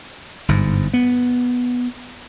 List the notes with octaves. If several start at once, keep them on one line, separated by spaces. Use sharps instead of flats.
G1 G#2
B3